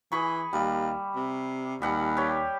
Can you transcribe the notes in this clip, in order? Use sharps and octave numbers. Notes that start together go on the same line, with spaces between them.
E3 G#4 B5 C#6
D#2 G3
C3
D#2 G3 F#5
G4 C#5